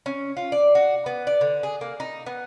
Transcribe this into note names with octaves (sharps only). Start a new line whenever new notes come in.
C#4
F4
D5
F#4
B3
D5
D3
G#4
A#3
D#4
B3